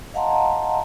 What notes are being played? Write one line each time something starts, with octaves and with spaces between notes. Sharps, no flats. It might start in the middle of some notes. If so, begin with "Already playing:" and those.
D#5 F5 F#5 A5 A#5 C6